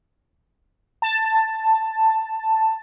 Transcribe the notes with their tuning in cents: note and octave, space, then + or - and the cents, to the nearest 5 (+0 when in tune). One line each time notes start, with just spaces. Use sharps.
A5 +5